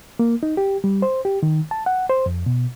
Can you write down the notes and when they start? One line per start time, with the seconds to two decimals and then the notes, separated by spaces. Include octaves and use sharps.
0.19 A#3
0.43 D#4
0.57 G4
0.84 G3
1.02 C5
1.25 G4
1.43 D#3
1.71 A5
1.86 F#5
2.09 C5
2.26 F2
2.46 B2